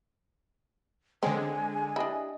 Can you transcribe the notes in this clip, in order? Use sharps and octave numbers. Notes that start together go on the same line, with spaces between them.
D3 G#3 C4 C#4 G#5
D4 E4 G4 D#5